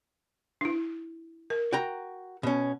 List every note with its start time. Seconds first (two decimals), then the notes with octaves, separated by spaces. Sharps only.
0.61 D4 E4
1.50 A#4
1.73 F#4 G5 A#5
2.43 B2 C#4